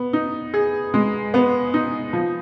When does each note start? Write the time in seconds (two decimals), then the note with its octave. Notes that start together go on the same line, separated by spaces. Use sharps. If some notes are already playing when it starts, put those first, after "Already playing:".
Already playing: B3
0.13 D#4
0.54 G#4
0.94 G#3
1.34 B3
1.74 D#4
2.13 F3